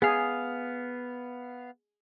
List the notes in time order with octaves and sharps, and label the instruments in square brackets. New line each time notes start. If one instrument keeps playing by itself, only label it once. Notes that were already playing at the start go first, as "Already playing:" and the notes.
[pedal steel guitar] B3 F5 [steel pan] G#4